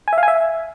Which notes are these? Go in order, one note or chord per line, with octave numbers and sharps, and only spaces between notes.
G#5
E5
F5
G#5
E5